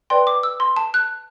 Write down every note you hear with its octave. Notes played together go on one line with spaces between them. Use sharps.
B4 D5 G5 C6
D6
E6
C6
A5
F#6